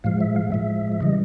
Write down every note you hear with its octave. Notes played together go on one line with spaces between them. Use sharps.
A2 F3 G#3 F5
E5
F5
A2 F3 G#3 E5
E5
C#3 E3 G3 D#5